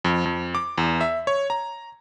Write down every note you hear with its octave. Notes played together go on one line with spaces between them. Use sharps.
F2
F2
D6
E2
E5
C#5
A#5